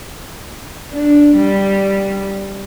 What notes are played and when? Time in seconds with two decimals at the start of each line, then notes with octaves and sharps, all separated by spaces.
0.91 D4
1.36 G3